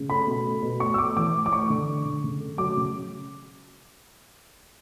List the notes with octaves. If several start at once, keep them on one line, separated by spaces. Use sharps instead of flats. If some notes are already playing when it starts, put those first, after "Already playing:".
Already playing: C#3
A3 B5
B2
A3
B2
A2 C#6
E6
A3 D6
E3 D6
A2
D6
A3 C#6
D3
A3
D3
C#3
A3
F#3 D6
C#3